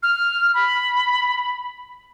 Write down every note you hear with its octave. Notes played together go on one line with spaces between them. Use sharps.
F6
B5